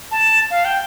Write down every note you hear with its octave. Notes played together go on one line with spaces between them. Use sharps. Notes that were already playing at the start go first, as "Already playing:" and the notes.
A5
F5
G5